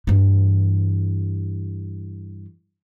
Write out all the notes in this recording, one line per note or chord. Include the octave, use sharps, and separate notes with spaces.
G2 E3